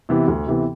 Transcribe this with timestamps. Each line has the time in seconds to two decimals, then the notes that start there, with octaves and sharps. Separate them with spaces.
0.09 C3 E3 B3
0.28 D2
0.47 C3 E3 B3